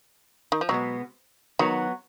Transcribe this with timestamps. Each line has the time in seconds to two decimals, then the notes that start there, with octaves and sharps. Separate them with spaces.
0.52 D#3
0.61 F3
0.69 B2 F#3 G#3 B3
1.59 D#3 F#3 B3 F#4 C#5